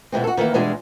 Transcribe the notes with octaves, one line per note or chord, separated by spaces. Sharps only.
B2 E3 G#3 C4
F#4 A4
D#3 E3 A3 A#3
B2 E3 G3 G#3 D4 G#4